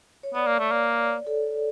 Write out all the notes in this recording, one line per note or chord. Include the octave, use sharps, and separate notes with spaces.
C#5
B3 D5
A#3
A3
A#3
A4